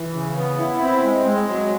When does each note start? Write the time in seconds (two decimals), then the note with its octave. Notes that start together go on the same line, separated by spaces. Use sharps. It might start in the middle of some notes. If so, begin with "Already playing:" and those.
Already playing: E3
0.14 C#3
0.36 B3
0.58 E4
0.81 C4
1.04 G#3
1.26 G#3
1.49 F#3